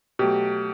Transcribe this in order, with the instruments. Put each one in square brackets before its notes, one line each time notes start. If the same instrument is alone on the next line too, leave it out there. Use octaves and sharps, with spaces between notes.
[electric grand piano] B2 F#3 A3 [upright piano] G4